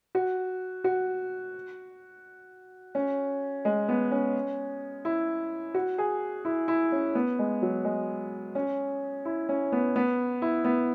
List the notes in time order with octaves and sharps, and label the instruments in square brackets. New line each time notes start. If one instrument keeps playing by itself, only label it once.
[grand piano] F#4
F#4
C#4
G#3
B3
C#4
E4
F#4
G#4
E4
E4
C#4
B3
G#3
F#3
G#3
C#4
E4
C#4
B3
B3
E4
B3